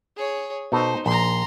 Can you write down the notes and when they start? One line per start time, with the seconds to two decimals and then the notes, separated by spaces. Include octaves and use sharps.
0.16 G#4 C#5
0.72 B2 D#4 A4 C5
1.06 A#1 A#5 C6